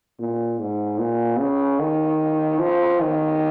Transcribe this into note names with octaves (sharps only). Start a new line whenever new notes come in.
A#2
G#2
A#2
C#3
D#3
F3
D#3